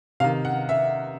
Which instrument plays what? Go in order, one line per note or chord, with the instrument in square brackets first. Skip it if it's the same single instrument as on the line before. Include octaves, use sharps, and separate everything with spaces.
[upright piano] C3 F5
D#3
F#5
E5